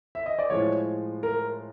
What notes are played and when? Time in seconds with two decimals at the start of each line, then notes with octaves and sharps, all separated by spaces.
0.15 E5
0.26 D#5
0.39 D5
0.50 A2 F3 G#3 C#5
1.23 A#4